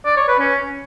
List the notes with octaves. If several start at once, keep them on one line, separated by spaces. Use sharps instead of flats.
D5
C#5
B4
C#4